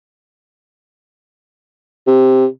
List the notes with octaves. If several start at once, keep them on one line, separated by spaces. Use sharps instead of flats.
C3